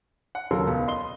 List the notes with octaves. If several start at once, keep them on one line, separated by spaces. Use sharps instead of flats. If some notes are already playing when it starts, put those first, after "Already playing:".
F#5
D#2 C#3 F#3 A4 A#4 C6
C#2 B3
D#5 C6 G7